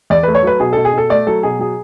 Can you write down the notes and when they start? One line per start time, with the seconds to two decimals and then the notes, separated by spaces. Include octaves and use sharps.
0.10 E2 D5
0.23 A3 B4
0.35 C#5
0.43 F#3 B4
0.60 B2 G#4
0.73 B2 A4
0.85 G#4
0.93 B2 A4
1.10 A3 D5
1.27 F#3 A4
1.43 B2 G#4
1.59 F#3 G#4